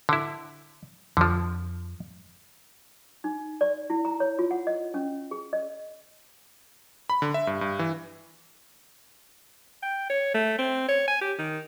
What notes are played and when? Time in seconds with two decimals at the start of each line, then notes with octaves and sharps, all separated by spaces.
0.09 D3 E4
1.17 F2 D3 F3
3.24 D#4
3.61 D5
3.90 E4
4.05 A#5
4.20 C#5
4.39 F4
4.51 F#5
4.67 D#5
4.94 C#4
5.31 G#4
5.53 D#5
7.10 B5
7.22 D3
7.34 E5
7.47 G2
7.61 G2
7.79 E3
9.83 G5
10.10 C#5
10.34 A3
10.59 C4
10.89 C#5
11.08 G#5
11.21 G4
11.39 D#3